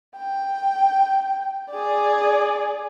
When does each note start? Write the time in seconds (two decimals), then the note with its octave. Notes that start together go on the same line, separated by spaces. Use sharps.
0.16 G5
1.70 G#4 D5